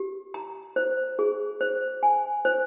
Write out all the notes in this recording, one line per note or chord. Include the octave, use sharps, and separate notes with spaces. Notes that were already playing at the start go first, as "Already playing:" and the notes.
Already playing: G4
A#5
C5
G#4
C5
G#5
C5